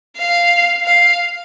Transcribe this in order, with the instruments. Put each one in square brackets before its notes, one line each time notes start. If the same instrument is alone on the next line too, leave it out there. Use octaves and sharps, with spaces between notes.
[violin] F5
F5